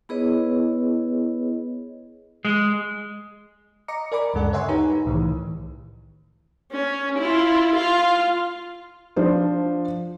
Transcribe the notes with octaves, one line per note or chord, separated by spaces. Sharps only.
B3 E4 G#4 B4 C#5 D#5
G#3
D#5 A#5 D6 C#7
A#4 D5 G#5 B5 D6
D2 G2 C#3 G#3 A4 F#5
C#5 D#5 E5 F#5 G#5 C6
D#4 G4 B4 C#5 A#5
C2 A2 D#3 E3
C#4
E4 F4
F4 F5
F3 D4 F4 C5